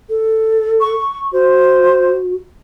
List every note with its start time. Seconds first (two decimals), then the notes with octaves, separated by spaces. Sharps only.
0.09 A4
0.80 C#6
1.32 F#4 C5